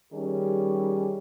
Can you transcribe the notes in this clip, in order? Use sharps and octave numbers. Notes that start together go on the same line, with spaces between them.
D#3 G3 C#4 G#4